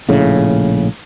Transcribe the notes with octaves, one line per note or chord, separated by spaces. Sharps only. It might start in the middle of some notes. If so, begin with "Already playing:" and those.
A#1 A2 C#3